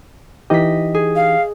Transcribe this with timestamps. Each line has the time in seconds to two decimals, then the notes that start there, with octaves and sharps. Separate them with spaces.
0.50 E3 D#4 G4 D#5 B6
0.94 G#4
1.16 F5